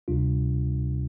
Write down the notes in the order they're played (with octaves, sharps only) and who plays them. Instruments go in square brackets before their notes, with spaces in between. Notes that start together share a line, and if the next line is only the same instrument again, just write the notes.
[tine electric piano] D2 C3 G3 D4 F4